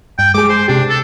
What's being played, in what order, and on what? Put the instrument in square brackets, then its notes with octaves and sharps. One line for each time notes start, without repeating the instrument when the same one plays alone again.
[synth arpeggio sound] G2 [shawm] G5
[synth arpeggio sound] G#3 G#4 [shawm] D6
[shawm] C5
[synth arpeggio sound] C3 G4 [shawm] D4
[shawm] A4